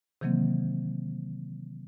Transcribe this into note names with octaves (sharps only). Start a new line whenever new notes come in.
C3 D#3 E3 F#3 A#3 C4